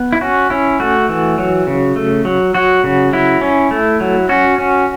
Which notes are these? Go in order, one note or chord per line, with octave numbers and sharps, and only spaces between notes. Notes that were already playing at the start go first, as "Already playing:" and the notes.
Already playing: B3 B4
E4
C#4 F#4
C#4 E4
A3 F#4
E3
F#3
C#3
A3
F#3
F#3 F#4
C#3
F#3 E4
C#4
A3
F#3
C#4 F#4
C#4